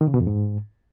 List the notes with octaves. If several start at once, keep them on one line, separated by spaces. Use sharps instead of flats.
D#3
C#3
B2
F2
G#2